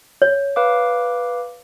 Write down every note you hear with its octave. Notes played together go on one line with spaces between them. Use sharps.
C#5
B4 F5 D6